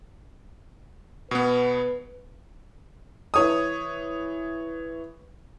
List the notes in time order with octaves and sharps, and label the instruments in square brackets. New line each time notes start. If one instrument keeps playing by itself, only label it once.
[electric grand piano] B2 B3 [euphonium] B4
[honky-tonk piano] E3 C#5 D#6